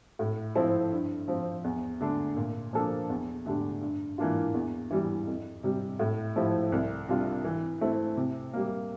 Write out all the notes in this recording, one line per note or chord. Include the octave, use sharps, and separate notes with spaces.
A2
F3 C4 E4 A4
G2
F3 C4
E2
D3 A3 D4
A#2
F3 A#3 D4 A4
E2
D3 A3 D4 G4
G2
E3 A#3 D4 F4
E2
E3 G3
F2
C3 G3
A2
F3 A3 E4 G4
C2
C3 G3 D4 F4
E3
A3 C4 E4
C3
G3 A#3